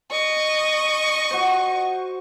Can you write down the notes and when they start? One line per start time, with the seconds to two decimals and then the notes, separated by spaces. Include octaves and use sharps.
0.11 D#5 C#6
1.31 F#4 C5